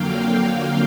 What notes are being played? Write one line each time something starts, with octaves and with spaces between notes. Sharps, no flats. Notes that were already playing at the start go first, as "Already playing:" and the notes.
Already playing: F2 D3 F#3 A#3 F5 G5